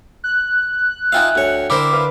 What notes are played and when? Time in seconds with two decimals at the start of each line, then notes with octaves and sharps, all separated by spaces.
0.24 F#6
1.12 D#4 F4 E5 F5 G5 G#5
1.35 D2 C#5
1.70 D3 E4 A#4 C5 D6
1.91 B4 F5